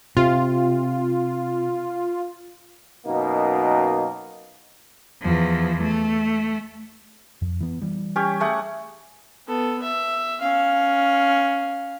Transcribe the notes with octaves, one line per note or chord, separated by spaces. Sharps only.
C3 F4
F#2 B2 A#3 D#4
E2 F3
A3
F2
E3 B3
E3 G3
C#4 G4 C#5
A3 G#4 F#5
B3 A4
E5
C#4 F5